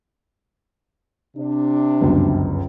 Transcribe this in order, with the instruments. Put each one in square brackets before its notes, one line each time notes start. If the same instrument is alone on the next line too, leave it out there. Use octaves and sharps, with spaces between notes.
[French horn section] C3 D4
[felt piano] G1 C#2 F#2